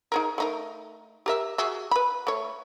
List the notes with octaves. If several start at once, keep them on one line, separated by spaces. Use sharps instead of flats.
D#4 G#4 A#4
A3 D#4 A#4
G4 A#4 E5
F#4 G#4 E5
B4 B5
A3 C#5